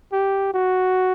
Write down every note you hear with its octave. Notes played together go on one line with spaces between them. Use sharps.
G4
F#4